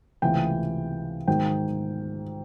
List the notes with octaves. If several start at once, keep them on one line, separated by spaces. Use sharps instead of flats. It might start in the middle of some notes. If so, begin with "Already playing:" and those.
C#2 C3 E3 A3 G5
G#2 D#3 F#3 G5